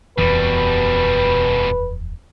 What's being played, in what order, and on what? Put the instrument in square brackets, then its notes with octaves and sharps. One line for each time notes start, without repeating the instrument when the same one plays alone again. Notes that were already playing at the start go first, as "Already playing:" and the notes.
[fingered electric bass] D#1 F2 E3 [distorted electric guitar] B2 G3 [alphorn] B4